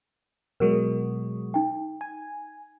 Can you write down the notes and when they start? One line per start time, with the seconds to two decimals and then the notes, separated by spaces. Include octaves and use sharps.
0.60 B2 F#3 G#3 A#4
1.54 D#4 G5
2.01 G#5